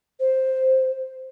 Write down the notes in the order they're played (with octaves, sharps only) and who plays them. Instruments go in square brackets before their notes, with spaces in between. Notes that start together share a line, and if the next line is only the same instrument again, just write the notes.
[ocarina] C5